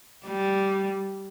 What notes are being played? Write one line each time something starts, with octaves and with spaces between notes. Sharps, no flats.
G3